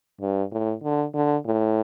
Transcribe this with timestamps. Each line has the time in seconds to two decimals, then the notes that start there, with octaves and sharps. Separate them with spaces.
0.21 G2
0.52 A2
0.83 D3
1.14 D3
1.45 A2